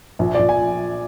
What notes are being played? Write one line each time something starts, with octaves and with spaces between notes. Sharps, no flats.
A#1
A#1 D5
G#5